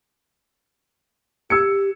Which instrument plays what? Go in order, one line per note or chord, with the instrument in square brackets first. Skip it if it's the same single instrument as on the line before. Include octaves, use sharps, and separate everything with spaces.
[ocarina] G4 [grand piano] E6 G#6 C#7